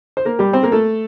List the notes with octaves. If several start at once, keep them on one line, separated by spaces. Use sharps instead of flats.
C5
A#3 A#4
G3 G4
C4 C5
A#3 A#4
A3 A4